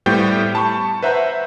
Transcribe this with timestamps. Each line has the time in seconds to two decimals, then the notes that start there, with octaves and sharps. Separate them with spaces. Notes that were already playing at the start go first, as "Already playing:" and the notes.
0.06 A2 G3 B3 C5 G5 G6
0.55 A5 B5 C#6
1.02 B4 C5 E5 F#5 A#5 G6